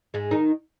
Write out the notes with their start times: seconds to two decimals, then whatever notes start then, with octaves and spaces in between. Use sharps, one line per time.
0.14 G#2 G#3
0.31 D#3 D#4